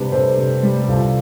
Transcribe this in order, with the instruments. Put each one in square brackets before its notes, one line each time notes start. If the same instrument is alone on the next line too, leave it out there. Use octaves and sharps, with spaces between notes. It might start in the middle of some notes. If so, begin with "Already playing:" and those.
Already playing: [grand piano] C3 G3 D4 G4 B4
C3 A4 C5
C3
G3
C2 F4 A4